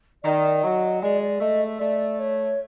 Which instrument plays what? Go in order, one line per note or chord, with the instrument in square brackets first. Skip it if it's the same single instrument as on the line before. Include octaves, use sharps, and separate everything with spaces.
[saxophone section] D#3 [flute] D5
[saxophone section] F#3 [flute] D#5
[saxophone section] G#3 [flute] D5
[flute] D5
[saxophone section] A3 [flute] D#5
[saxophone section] A3 [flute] D5
[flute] C#5